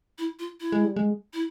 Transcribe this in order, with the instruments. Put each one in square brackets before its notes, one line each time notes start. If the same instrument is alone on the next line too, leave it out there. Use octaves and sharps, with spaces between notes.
[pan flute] E4
F4
E4
[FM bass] G#3
G3
G#3
[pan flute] E4